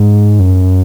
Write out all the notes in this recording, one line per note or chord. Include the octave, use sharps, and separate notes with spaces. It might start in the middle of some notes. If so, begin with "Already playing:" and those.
Already playing: G#2
F#2